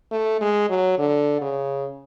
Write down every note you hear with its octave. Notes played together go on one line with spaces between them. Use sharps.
A3
G#3
F#3
D3
C#3